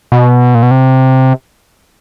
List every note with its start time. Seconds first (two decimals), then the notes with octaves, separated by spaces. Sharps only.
0.12 B2
0.55 A#2
0.63 B2
0.71 C3